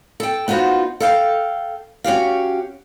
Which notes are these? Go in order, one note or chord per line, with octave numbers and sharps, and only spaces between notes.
A4 G5
B3 D#4 F4 F#4 C5
A4 F5 G5
C#4 F#4 G4 F5